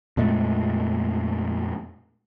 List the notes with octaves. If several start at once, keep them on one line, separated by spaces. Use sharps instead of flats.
F2 A#2 G#3 A3